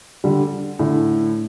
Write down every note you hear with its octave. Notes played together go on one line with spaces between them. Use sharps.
D3 G3
A2 D3